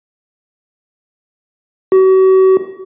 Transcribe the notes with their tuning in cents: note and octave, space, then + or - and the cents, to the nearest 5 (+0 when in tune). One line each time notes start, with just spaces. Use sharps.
F#4 +40